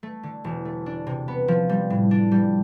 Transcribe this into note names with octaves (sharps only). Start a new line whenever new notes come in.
A3
D3
E1
A3
D4
C3
B3
F3
G3
A2
D4
G3